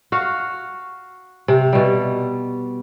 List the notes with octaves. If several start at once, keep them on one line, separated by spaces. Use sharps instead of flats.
F#4 F5
C3
B2 G3